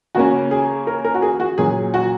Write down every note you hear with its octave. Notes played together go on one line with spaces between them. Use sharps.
C#3 A#3 C#4 F#4
G#4
A#4
A#4
F#4
G#4
F#4
A#2 F#3 A#3 C#4 G#4
F#4